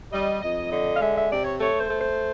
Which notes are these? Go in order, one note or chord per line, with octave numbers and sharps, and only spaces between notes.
G3 D#5
F2 D#5
D3 D#5
F5
G#3 E5
E5
C3 D5
C#5
A3 C#5
C5
A3
C5